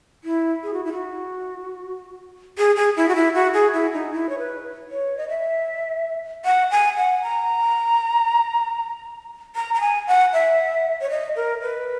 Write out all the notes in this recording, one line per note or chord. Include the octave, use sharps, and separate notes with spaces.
E4
G#4
F#4
E4
F#4
G#4
G#4
E4
F#4
E4
F#4
G#4
E4
D#4
E4
C#5
B4
C#5
D#5
E5
F#5
G#5
F#5
A#5
A#5
A#5
G#5
F#5
E5
C#5
D#5
A#4
B4